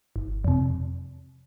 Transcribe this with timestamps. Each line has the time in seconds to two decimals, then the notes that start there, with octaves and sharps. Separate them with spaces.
0.16 G1
0.44 F2 C3